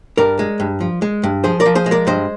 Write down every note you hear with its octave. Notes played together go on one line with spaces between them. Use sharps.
G2 A#4 D5
G#3
G2
F3
G#3
G2
F3 G#4 C5
A#4 D5
F3
G#4 C5
G#3
A#4 D5
G2 C5 D#5